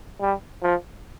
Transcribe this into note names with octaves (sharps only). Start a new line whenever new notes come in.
G3
F3